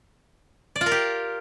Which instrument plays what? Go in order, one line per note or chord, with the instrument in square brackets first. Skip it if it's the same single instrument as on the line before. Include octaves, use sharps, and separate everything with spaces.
[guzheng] D5
F4
A#4
G4